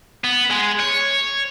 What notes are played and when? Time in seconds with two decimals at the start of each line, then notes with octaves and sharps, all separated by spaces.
0.24 B3
0.51 G#3
0.80 C#5